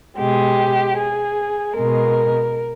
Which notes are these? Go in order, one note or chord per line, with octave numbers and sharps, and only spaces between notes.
B2 G#3 G4
G#4
B2 G#3 A#4